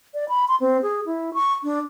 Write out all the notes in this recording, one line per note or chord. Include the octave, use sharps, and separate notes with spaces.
D5
B5
C6
C4
G#4
E4
C#6
D4